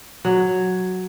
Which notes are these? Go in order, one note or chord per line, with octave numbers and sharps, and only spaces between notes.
F#3